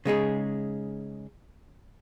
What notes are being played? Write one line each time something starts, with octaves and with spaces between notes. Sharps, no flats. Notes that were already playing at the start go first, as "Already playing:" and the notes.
C#3 G#3 D#4 G#4